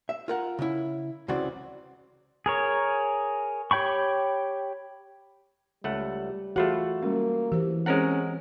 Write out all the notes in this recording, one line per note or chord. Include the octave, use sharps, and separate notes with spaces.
E5
F4 A#4 F#5
C#3 E4
C2 C#3 E3 C4 F#4 D5
G#4 A#4 C#5
G4 C#5 G5 B5 C#6
C#2 G3 A3 F#5
E3 A3 F4 F#4 G#4 F#5 B5
G3 G#3 A#3 C#4
E3 G4 C5
G#3 C4 C#4 A#4 C5 C#5 F#5